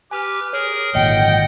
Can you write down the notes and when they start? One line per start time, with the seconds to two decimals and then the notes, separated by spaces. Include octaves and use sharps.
0.11 G4 B4 G#5 D6 F6
0.53 G#4 A#4 C#5
0.95 G#1 D2 A#2 D#5 F#5 G5 A#6